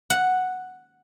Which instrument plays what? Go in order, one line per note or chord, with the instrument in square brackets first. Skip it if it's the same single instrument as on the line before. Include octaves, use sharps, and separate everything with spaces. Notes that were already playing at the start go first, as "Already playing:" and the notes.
[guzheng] F#5